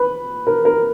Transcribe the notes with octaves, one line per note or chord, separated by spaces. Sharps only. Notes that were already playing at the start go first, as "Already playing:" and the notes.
Already playing: B4
A#4
A#4